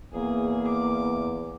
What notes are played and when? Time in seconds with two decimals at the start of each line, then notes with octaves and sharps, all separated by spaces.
0.14 E2 A#3 G#4
0.67 D6